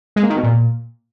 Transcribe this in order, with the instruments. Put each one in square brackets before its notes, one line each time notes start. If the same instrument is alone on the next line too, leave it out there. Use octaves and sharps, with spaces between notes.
[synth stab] G#3
A#3
D#3
B2
A#2